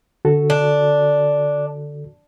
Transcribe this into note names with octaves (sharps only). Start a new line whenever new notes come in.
D3 F#4 A4
D4